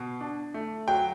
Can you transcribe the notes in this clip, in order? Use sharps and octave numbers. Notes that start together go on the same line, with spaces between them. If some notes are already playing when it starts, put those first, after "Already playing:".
Already playing: B2
D4
A3
F#3 G5